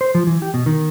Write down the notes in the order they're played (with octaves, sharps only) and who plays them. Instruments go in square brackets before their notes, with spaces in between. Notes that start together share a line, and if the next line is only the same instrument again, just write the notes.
[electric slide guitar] C5
F3
E3
G4
B2
D#3